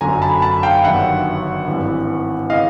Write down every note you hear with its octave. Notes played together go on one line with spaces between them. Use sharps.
G1 F#2 D3 F#3 G#5 A#5
A5 B5
A5 B5
F5 G5
G1 G2 D#3 F#3 E5 F#5
G#1 G2 E3
C#3 E3 D#5 F5